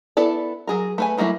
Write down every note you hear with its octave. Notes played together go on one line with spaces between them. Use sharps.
B3 E4 A4 D5
F#3 G#4 A#4
A3 B4 G#5
E3 F#3 A3 A#3 E4